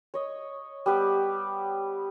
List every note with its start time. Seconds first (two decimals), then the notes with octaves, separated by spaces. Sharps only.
0.14 C#5 D#5
0.86 G3 B3 G4 B4